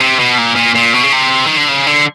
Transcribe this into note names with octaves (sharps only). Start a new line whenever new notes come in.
C3
B2
A#2
A#2
A#2
B2
C#3
C3
D#3
D3
C#3
D3